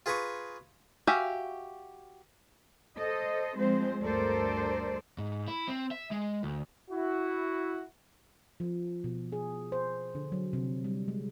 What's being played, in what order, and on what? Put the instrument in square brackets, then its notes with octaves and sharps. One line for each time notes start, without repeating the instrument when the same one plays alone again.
[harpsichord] F4 G#4 B4 A#5 C#6
[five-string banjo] F#4 G4 E5 F5 G#5
[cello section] A4 C5 D#5
F3 G#3 C4 C5
D2 G2 A4 A#4 C5 D5
[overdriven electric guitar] G#2
E4
C4
E5
G#3
D2
[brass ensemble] E4 F#4
[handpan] F3
B2
G#4
C5
D3
F#3
C3
G3
G#3